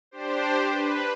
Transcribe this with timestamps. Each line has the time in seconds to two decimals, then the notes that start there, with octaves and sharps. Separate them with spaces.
0.11 D4 G4 C5
0.69 B4